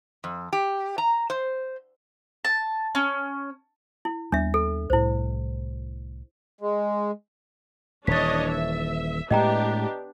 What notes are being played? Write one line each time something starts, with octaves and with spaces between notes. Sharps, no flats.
F2
G4
A#5
C5
A5
C#4
E4
D#2 G3 B3 D4 E5
A4
C2 A2 E4 C5
G#3
D#1 E3 D4 C#5 D#5 A6 B6
E5
A2 G#3 B3 D4 G4 D#5 G5 A#5